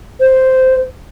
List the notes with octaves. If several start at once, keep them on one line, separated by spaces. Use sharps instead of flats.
C5